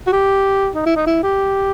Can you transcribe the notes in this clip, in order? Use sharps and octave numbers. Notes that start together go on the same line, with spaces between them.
F#4
G4
D#4
E4
D#4
E4
G4